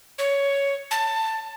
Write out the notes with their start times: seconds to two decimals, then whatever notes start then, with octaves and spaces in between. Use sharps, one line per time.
0.18 C#5
0.91 A5